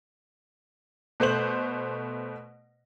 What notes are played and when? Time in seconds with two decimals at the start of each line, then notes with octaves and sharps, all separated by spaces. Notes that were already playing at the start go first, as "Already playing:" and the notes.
1.20 B2 A3 C5 F#7